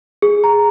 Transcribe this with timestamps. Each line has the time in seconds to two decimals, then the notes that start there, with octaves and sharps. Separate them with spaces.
0.22 G#4
0.44 A#5